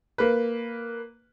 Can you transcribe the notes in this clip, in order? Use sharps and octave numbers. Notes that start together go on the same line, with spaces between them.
A#3 B4